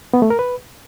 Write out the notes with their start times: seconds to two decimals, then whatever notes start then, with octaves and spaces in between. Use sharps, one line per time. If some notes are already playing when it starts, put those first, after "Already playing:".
0.14 B3
0.22 A3
0.30 A#4
0.39 B4